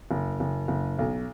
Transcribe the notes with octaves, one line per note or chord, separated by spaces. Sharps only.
F#1
F#1
F#1
B1